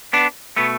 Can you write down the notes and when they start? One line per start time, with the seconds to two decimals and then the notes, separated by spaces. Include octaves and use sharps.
0.13 B3 D4
0.56 B2 A3 B3